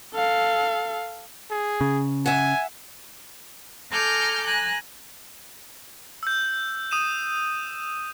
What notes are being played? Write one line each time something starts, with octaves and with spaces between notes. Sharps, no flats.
A4 F5
G#4
C#3
E5 F#5 G#5
A4 G#5 A#5 D6 F6 G6
G#5 A#5 F#6
E6 G6
D#6 D#7 E7